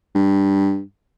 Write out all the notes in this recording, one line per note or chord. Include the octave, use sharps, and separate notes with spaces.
G2